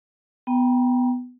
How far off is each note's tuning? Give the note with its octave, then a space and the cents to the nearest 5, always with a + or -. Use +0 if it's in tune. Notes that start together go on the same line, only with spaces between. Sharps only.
B3 +10 G5 +0 A#5 +35